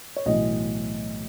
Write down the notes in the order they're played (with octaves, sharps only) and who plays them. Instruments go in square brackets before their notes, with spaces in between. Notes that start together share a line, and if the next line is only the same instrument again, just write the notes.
[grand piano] C#5
B1 A2 E3 D#5